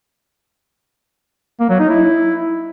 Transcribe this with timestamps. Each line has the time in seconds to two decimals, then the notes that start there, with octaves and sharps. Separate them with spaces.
1.60 A#3
1.70 F#3
1.80 D#4
1.89 E4